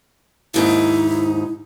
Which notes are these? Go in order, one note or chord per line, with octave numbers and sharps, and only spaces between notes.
D#2 G#2 D#4 E4